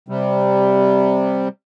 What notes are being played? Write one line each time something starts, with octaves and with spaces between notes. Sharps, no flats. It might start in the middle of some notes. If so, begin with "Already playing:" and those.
C3 G3